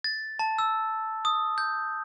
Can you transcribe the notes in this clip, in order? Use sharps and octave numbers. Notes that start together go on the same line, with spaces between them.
A6
A5
E6
D#6
G6